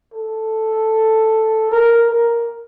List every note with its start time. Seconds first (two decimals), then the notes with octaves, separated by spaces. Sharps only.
0.13 A4
1.72 A#4
2.10 A#4